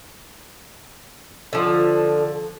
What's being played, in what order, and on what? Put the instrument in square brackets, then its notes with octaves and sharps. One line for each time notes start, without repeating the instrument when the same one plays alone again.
[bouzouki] D3 F3